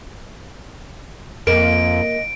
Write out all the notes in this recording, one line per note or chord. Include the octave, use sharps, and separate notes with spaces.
F2 A#3 D#5 D7